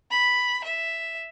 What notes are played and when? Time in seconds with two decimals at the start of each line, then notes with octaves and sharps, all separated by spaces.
0.10 B5
0.64 E5